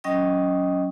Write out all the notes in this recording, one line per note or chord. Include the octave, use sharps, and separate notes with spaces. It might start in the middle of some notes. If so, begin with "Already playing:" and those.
F#3 C#4 D#5 G5 D#6